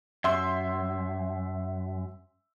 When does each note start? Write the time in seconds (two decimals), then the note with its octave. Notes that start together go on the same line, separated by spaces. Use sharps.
0.24 F#2 E5 C6